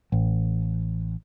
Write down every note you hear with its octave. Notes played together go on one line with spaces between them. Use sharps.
A1